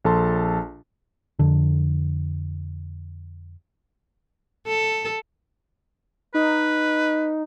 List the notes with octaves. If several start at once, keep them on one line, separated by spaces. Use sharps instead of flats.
A#1 A4 A5 C6
F2 D3
A4
D#4 B4